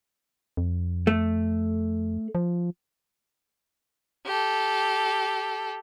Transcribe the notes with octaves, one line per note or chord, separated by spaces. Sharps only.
F2
A3
F3
G4 A4